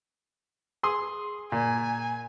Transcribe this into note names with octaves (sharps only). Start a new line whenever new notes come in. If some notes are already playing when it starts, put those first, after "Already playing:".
G#4 C6 D#6
A#2 G#5